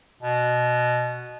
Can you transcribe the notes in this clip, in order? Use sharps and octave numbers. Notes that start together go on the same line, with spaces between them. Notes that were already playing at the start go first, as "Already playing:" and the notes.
B2